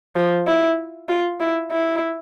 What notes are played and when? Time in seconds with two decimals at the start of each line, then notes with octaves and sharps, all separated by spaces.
0.16 F3
0.47 E4
1.09 F4
1.41 E4
1.72 E4